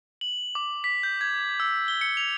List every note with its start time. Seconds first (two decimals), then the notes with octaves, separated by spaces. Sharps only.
0.21 F#7
0.55 D6
0.84 B6
1.03 G6
1.21 G#6
1.60 E6
1.88 G7
2.01 C#7
2.17 F7